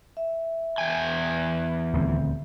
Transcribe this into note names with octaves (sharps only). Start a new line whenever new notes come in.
E5
E2 G5 G#5
D#1 D2 C4